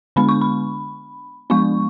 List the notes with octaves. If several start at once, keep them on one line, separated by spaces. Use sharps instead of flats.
D3 G#3 B3 D4 B5
C#6
B5
F3 G#3 B3 D4 C#6